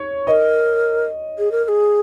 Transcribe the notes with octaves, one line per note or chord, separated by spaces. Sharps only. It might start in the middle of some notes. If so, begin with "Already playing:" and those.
Already playing: C#5
A#4 B4 D#5
G#4
A#4
A#4
G#4